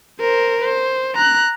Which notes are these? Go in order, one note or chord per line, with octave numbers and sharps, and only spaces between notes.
A#4 C5
C5
A#5 F#6